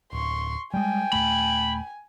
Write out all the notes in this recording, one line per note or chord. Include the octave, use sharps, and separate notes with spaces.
D1 C6 C#6
G3 G#3 G5 G#5
D#1 D#2 A3 B5